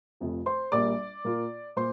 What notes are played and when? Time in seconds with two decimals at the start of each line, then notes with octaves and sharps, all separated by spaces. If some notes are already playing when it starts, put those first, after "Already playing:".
0.20 F1 F2 F3
0.46 C5 C6
0.71 A#1 A#2 G3 A#3 D5 D6
1.24 A#2 A#3 F4
1.76 A#2 C5 C6